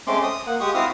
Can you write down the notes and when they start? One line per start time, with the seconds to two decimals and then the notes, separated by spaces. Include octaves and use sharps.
0.07 G#3 A3 C4 C#4 C6 D6
0.23 D#6
0.47 A#3 F#5
0.60 G#3 G4 C#6 D#6
0.74 C4 E4 F#4 F5 D#6 F6